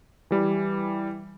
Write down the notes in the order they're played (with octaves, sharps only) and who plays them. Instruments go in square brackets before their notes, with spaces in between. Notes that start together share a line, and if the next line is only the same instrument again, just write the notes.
[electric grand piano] E3 G3